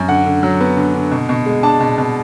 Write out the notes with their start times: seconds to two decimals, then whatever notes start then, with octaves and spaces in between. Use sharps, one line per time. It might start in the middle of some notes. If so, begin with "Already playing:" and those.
Already playing: F#2
0.08 D3 F#5
0.26 D3
0.43 F#3
0.61 B3
0.77 D3
0.95 D3
1.12 B2
1.29 B2
1.46 G#3
1.63 D4 A5
1.80 B2
1.98 B2